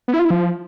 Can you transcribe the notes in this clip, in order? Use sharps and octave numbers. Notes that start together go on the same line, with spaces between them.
B3
E4
F4
E4
F3